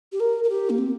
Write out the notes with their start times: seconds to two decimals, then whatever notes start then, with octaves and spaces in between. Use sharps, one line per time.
0.12 G4
0.19 A#4
0.43 A#4
0.49 G4
0.69 A#3
0.78 C4